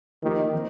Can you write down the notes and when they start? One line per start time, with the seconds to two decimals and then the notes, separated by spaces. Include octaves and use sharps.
0.23 D#3 F3 A#3 G4
0.53 D#3 C4